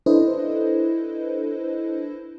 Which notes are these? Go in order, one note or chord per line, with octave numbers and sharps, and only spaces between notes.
D4 E4 A4 B4 C5 D#5